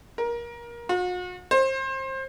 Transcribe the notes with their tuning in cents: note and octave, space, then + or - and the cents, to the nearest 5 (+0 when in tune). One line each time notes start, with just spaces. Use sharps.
A#4 +20
F#4 -45
C5 +25